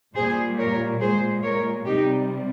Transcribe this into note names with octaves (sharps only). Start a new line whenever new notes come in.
A#2 G3 G#4 C5
A#4 C#5
A#2 G#3 G#4 C5
A#4 C#5
C3 G3 D#4 G4